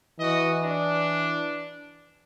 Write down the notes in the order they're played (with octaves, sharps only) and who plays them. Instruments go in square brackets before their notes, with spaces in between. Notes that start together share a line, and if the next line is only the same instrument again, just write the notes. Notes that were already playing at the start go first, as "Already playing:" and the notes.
[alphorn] E3 [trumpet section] F#4 D#5
[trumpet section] D4